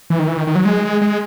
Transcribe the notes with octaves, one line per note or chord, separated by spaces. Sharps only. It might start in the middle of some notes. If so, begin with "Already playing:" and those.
E3
D#3
E3
D#3
D#3
F#3
G#3
G#3